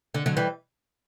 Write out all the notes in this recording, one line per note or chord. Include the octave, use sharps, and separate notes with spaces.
D3
D3 F#3
E3 G3